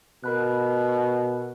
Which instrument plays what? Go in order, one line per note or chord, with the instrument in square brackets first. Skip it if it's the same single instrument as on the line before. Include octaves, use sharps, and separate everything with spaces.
[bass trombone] B2 [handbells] A#4 B5 F#6